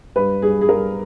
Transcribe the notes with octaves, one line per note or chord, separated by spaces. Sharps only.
G2 B4
G2 G#4
G#4
G2 A#4